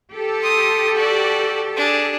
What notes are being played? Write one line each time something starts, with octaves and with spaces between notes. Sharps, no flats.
G4 A4
C6 D#6
F#4 D5
D4 G#4